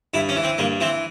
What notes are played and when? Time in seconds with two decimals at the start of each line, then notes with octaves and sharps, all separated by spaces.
0.14 G2 E4
0.29 C#4
0.36 E3
0.43 C4
0.58 G2 A#3
0.81 E3 C4